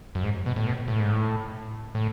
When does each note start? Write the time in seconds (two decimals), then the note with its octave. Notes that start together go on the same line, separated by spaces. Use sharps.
0.15 F#2
0.24 G#2
0.46 B2
0.56 A2
0.66 B2
0.88 A2
1.00 G#2
1.11 A2
1.95 A2